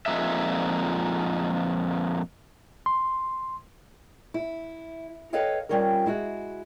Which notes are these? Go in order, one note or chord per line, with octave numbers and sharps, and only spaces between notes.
F2 A#2 F3 G#3 D#4 E5
C6
E4
A4 B4 C#5 D#5 F5 G5
G3 C4 C#4 F4 A#4
G#3 E4 F#4